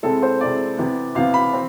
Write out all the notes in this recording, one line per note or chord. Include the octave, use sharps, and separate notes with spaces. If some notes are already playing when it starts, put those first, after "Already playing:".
C3 G#3 C4 E4 A4
C5
C3 G#3 C4 E4 D5
C3 E3 B3
C3 E3 B3 F5
B5
C4